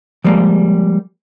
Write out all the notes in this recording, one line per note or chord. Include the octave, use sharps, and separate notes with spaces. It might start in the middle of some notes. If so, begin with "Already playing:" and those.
F3 G3 G#3 A#3